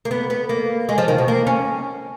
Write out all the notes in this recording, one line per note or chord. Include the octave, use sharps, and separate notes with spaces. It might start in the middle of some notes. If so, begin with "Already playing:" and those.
A#3
B3
B3
A#3
G#3
F3
D#3
B2
A#3
C#4